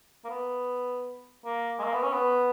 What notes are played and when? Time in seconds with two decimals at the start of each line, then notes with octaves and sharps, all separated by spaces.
0.24 A#3
0.29 B3
1.45 A#3
1.79 G#3
1.83 A#3
1.93 B3
2.03 C#4
2.13 B3